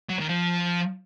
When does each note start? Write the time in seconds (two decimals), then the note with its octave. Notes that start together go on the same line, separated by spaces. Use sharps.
0.10 F#3
0.19 D#3
0.29 F3